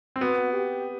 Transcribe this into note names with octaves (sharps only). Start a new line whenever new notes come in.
C4
B3 F#4
G4